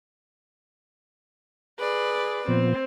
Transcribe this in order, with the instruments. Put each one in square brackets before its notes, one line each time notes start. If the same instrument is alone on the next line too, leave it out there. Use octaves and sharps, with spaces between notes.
[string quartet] G#4 B4 D5
[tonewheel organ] A#2 F3 B3 [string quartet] C4